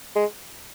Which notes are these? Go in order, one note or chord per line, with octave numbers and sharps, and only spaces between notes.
G#3